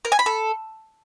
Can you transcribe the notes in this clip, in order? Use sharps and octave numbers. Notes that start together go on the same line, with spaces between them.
A#4
G#5
B5
A4